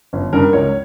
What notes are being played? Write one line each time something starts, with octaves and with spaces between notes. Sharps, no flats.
G1
G2 D#3 A#4
C#2 C#5